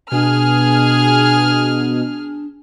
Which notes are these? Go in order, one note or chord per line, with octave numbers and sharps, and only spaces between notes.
B2 D4 G#4 F6